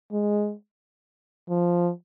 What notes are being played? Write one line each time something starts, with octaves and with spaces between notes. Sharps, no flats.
G#3
F3